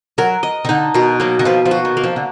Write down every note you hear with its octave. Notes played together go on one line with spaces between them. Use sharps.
F#3 A#4
D#5
D#3
D3 D#4
B2 D#3
F#3 A#3
D#3
F3 B4
F3
F#4
D#3
A#3
F3
D3